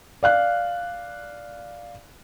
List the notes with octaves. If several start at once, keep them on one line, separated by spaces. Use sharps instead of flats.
D5 F5 F#6